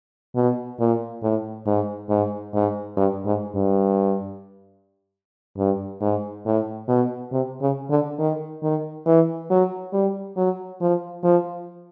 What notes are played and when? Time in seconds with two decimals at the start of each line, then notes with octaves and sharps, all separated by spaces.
0.36 B2
0.80 A#2
1.23 A2
1.66 G#2
2.10 G#2
2.54 G#2
2.97 G2
3.26 G#2
3.56 G2
5.58 G2
6.01 G#2
6.46 A2
6.88 B2
7.32 C3
7.61 C#3
7.90 D3
8.19 D#3
8.63 D#3
9.06 E3
9.50 F#3
9.93 G3
10.37 F#3
10.81 F3
11.24 F3